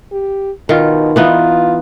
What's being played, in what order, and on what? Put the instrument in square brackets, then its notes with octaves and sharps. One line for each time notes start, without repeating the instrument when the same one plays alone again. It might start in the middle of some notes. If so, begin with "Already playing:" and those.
[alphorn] G4
[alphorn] B2 [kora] D#3 F4
[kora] E3 B3 D#4 [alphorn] F4